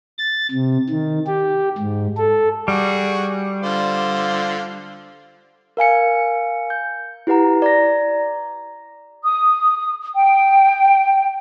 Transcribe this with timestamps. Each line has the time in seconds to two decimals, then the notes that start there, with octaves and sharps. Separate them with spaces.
0.19 A6
0.51 C3
0.89 D#3
1.27 G4
1.78 G#2
2.17 A4
2.68 G3 F#4 G#4
3.63 D3 F4 C5
5.77 A#4 F5 G#5 C#7
6.70 G6
7.27 E4 G4 B4 F#5 A#5
7.62 D5 A#5 A#6
9.24 D#6
10.15 G5